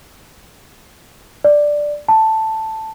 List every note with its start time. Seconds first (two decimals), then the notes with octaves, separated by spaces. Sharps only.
1.44 D5
2.08 A5